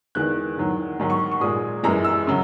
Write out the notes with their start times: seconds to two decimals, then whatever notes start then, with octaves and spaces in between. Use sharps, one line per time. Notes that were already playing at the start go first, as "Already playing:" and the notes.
0.15 E2 D#3 G#3 F#6
0.58 E2 D#3 F#3
0.99 G#2 D#3 F#3
1.10 C#6
1.31 C#6
1.41 A#2 G#3 D#6
1.83 F#2 E3 G#3 A#5
2.04 E6
2.27 C#3 F#3